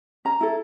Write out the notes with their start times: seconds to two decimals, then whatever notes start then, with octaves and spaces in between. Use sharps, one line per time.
0.25 C#4 A#5
0.41 E4 A4